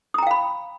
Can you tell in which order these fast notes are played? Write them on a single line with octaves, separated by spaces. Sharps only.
D#6 A#5 G5 F5 B5